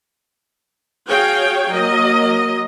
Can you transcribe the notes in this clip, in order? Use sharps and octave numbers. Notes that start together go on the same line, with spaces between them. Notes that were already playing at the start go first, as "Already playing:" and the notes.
F#4 G#4 C#5 F5 G5
F#3 A#3 D#5